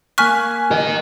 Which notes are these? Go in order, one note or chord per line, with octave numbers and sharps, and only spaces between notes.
A#3 G#5 C#6 F6 F#6 B6
A#4 D#5